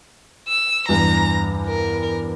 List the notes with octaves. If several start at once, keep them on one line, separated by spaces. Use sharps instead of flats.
E6
E2 G2 A#5
A#4